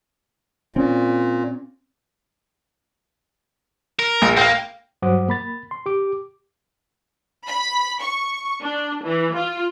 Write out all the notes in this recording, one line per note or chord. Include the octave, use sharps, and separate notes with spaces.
A#2 C4 C#4
A#4
A#1
A#3 F5 G5
G2 F#3 C5 F#5 D6 D#6
A#3 B5 A6
C6
G4 D6
B5
C#6
D4
E3
F4